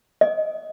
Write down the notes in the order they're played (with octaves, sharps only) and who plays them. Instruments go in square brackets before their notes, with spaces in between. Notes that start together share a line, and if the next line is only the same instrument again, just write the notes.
[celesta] D#5